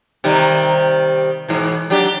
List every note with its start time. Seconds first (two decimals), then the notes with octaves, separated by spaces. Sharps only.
0.24 C3 D#3 G3
1.49 G#2 B2 E3
1.90 F#3 D4 G4